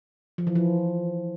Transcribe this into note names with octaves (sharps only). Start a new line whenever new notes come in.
F3
E3
F3